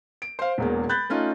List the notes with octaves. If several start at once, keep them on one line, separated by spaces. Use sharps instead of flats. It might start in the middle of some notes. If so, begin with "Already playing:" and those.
D7
C5 F5
E1 E2 A#3
B5 F#6 G6 A6
A3 C#4 D#4 F4